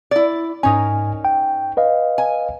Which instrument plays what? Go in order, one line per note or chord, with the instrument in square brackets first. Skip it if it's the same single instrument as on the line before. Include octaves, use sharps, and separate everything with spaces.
[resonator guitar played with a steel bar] E4 D5
[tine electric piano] G#2 G#5 [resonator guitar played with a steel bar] C#4 D#4 A#4
[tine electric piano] G5
B4 D#5 F5
[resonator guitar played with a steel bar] G#5